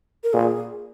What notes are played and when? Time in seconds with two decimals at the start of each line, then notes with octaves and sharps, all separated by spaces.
0.24 A#4
0.33 A#2 G#4